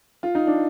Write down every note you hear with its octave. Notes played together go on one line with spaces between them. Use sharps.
F4
D#4
D4